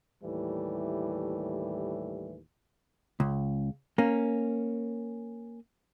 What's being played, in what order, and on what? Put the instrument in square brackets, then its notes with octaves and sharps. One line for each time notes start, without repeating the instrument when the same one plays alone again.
[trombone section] D#2 A2 E3 G3
[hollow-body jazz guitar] C#2
A#3 C#4